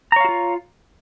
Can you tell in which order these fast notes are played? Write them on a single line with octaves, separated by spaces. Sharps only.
A#5 C#5 F5 F#4 F4